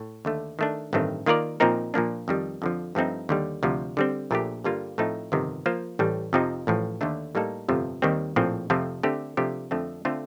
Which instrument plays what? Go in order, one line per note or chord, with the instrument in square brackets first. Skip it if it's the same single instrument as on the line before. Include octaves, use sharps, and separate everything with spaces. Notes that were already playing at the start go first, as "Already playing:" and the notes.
Already playing: [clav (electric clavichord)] A2
D#2 D3 A3
D#3 A3 D4
A1 G2 D#3 A3 C4
D#3 A#3 F4 A#4 D5
A#2 F3 C4 D#4 A#4
A#2 F3 A#3 D4
F2 D#3 G3
F2 D3 F3
G2 F3 A3 C4 D#4
D#2 D3 G3
D2 C3 F3
D3 G3 C4
A#1 A#2 A3 D4 G4
G2 D3 G3 A#3 F4
A2 F3 A3 C4 D#4
G1 F2 C3 D#3
F3 A#3 F4 C5
A1 A2 G3
F2 C3 F3 C4 D#4
A1 A2 F3
D#2 D3 A3 D4
A2 G3 A#3 D#4 A4
G1 F2 C3 F3 A3
D#2 D#3 G3 C4
A#1 A2 F3 C4
F2 C3 F3 A3 C4
D3 A3 C4 G4
C3 F3 A3 D4 G4
F2 D3 A3 C4
D3 A3 C4 F4